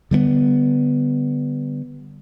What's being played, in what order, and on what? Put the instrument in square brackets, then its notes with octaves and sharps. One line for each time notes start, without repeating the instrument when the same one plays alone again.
[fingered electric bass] D3 G3 A3 B3